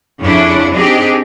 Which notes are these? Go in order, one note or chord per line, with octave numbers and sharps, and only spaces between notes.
F2 C#3 C#4 D4 E4
C4 D4 D#4 G4 G#4